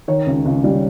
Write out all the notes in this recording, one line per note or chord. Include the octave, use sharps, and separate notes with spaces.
D#3 C#5
C#2
C#2
G3